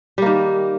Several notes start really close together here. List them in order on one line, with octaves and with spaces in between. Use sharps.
G3 A#3 D#3